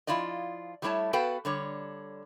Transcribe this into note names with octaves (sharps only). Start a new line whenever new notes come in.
F3 G3 E4 F4 D5 D#5
F#3 G3 A3 E4 C#5 A5
B3 F#4 A4 B4 F5 G5
D3 G3 C#5